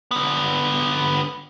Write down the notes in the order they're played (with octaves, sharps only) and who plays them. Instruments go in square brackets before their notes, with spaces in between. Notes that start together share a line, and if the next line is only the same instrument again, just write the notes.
[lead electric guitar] D3 B3